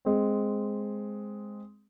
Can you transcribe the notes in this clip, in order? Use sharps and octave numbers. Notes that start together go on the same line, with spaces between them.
G#3 C4